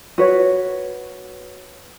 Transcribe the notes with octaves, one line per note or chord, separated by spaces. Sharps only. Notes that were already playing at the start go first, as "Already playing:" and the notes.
F#4 B4 C#5